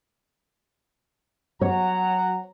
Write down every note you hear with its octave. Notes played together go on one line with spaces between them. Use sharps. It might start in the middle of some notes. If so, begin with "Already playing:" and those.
F#3 C#5 F#5 A#5